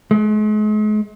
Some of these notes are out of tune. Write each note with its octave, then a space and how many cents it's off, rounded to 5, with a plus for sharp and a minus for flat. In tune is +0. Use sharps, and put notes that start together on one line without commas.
G#3 +40